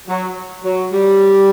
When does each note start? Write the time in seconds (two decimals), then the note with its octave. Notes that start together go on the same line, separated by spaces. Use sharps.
0.08 F#3
0.64 F#3
0.92 G3